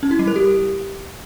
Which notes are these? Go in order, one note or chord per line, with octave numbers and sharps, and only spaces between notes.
C#4
E4
G3
A#4
G4